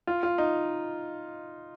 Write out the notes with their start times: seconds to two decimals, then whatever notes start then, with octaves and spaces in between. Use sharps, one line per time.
0.07 F4
0.23 F4
0.38 D#4